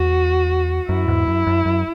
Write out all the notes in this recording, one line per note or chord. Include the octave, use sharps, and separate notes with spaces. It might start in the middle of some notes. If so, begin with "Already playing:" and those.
Already playing: E2 F#4
F#2 E4
E2 G#2
F#2
F#2
F#2